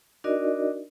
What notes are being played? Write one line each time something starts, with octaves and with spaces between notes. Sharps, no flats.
D4 D#4 F#4 A#4 D5 D#5